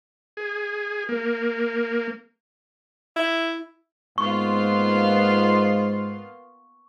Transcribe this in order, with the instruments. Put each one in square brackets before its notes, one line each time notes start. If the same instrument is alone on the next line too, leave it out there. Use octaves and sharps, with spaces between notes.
[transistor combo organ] G#4
A#3
[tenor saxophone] E4
[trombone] G#2 [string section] A#3 B3 F4 [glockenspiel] C#6